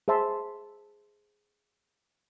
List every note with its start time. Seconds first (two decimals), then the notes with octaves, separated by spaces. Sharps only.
0.08 G#4 C5 E5 A5 C6